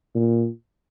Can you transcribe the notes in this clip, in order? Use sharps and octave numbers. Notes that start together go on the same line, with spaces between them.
A#2